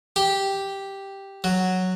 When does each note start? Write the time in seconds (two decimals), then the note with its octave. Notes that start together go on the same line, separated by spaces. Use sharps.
0.16 G4
1.44 F#3